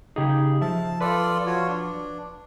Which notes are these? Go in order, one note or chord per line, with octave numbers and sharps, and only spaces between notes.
C#3 D#4 G4 G#4
F3 E5 A5
F4 A4 B4 D5
F4 F#4 C#5
D4